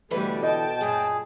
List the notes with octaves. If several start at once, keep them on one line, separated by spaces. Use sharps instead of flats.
B2 D3 E3 G3 A3 B4
D#5 G5 A5
F#2 A#2 G#4